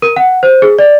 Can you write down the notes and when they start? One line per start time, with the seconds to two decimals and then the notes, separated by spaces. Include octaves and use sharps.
0.02 A#4
0.16 F#5
0.43 C5
0.62 G#4
0.79 D5